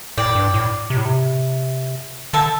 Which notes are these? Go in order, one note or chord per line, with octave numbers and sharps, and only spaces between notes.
A2 D5 G5
G2
A2
C3
A2
C3
D3 E5 A5